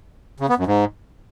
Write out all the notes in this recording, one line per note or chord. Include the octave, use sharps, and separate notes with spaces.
C#3
B3
F#2
G#2